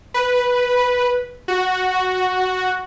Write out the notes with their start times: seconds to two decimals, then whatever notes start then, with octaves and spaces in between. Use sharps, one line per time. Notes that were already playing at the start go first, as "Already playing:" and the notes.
0.14 B4
1.48 F#4